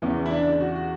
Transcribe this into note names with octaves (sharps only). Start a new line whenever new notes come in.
E2 C#3 E3 C#4
E4
D4
F#4
F#4